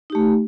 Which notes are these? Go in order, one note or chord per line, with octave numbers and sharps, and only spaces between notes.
A3 D#4 G4